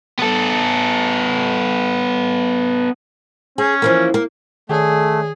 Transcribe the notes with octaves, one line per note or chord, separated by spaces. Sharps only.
B3 A4
C#4 G#4
E3 F3 A#3
A#3
D#3 A3 G#4 C#5 D5